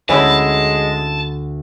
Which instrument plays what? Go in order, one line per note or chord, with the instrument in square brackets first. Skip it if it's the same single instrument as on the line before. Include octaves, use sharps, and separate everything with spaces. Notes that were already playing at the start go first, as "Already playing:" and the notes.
[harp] D2 F#5 D7 [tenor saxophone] G#3 [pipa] A3 C#4 E4 [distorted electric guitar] A5